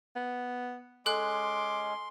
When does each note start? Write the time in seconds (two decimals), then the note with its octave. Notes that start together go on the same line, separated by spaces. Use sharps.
0.16 B3
1.06 G#3 C#4 A4 C6 D6 F#6